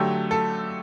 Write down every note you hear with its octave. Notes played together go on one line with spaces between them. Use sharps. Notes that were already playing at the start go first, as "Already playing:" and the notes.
Already playing: D3 F#3 A3 G4
A4